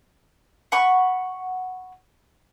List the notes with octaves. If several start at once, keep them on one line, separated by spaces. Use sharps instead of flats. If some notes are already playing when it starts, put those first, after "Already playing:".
F#5 B5 C#6